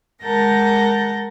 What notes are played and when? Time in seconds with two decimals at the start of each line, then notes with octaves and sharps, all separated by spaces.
0.24 G#3 A#4 F#5 A5 G6 A#6